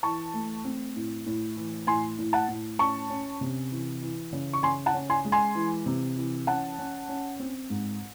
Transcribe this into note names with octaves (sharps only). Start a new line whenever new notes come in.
E3 A5 C#6
A3
C4
A2
A2
E3
A2 G#5 C6
A2
F#5 A5
A2
C#4 A5 C#6
C#4
C3
E3
E3
C#3
C#6
C#3 G#5 C6
F#5 A5
C#4
G#5 C6
G#3
G#5 C6
E3
C3
E3
C#4 F#5 A5
C#4
C#4
C4
G#2